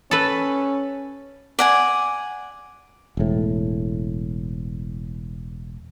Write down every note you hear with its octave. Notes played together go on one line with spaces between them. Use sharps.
C#4 A4 B4
D5 F#5 G#5
E1 A2